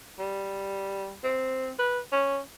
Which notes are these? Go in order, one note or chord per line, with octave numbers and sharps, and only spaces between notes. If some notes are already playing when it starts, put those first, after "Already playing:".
G3
C4
B4
C#4